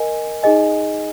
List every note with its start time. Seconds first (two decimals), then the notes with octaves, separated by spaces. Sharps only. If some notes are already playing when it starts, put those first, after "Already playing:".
Already playing: A#4 D#5 G#5
0.43 D#4 G#4 D#5 G#5